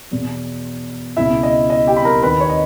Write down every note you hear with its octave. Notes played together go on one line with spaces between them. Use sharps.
E2 B2
C#2 B2 E4 E5
D#5
D#5
G4 G5
B5
A#4 A#5
D#2 D#3 B4 B5
C#5
D#5